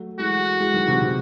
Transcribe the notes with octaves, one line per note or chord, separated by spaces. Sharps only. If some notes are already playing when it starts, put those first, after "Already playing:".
Already playing: F#3 A3
E3 G#3 F#4
E3 G#3
D#3 F#3
E3
C3 D#3
C3 D#3